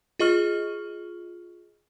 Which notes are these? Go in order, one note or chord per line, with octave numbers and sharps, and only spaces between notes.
F4 G#4 D#5 C#6 F6